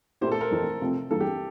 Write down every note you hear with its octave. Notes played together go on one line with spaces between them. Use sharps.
A#2 A3 E4 G4 C5
A4
A#4
F2 E3 A3 C4
C3 F3 A3 C4
G2 E3 A#3 A4
G4